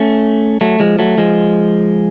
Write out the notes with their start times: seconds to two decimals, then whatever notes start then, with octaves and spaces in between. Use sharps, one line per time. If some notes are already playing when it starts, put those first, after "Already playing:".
Already playing: A3 C#4
0.61 F#3 A3
0.80 F3 G#3
0.99 F#3 A3
1.18 F3 G#3